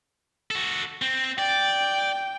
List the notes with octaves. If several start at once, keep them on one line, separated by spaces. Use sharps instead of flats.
F#4 A4
C4
D5 G5